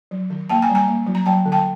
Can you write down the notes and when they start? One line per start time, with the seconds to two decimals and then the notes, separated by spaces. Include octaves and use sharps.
0.11 F#3
0.30 D#3
0.49 A#3 G5 A5
0.62 G#5 A#5
0.69 G3
0.75 G#5 A#5
0.88 A#3
1.07 F#3
1.15 A#5
1.26 F#3 G5 A5
1.46 D3
1.52 G5 A5